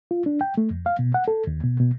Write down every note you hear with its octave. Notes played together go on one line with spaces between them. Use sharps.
F4
D4
G5
A3
F2
F5
B2
F#5
A4
D#2
B2
B2